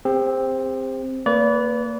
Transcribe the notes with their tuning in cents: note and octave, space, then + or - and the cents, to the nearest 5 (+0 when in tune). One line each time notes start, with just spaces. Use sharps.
C4 +5 G4 +45
A#3 -30 B4 +0 D5 -35